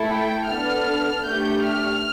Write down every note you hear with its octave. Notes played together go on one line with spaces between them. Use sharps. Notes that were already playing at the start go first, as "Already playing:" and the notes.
Already playing: A3 E4 A4
G5
B3 D4 A4 F6
A3 D4 G4 G6
F6